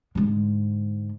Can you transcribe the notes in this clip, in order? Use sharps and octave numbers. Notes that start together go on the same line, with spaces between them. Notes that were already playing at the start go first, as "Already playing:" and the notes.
G#2 D3